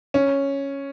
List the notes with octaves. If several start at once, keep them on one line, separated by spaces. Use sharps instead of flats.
C#4